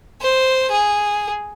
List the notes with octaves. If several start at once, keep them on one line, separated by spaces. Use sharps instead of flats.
C5
G#4